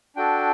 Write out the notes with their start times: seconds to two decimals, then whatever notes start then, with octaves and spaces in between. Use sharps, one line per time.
0.16 D4 F#4 A4 G5